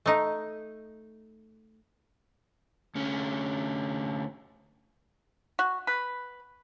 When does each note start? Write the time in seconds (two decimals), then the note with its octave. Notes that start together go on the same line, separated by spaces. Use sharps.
0.06 A3 D#4
2.95 D2 C#4
5.59 F#4
5.87 B4